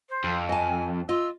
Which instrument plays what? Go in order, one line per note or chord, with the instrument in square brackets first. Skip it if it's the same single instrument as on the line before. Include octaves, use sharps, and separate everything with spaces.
[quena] C5
[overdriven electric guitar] F2
[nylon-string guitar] D#5 A5 [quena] G#5
[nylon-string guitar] F4 D#5 [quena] E6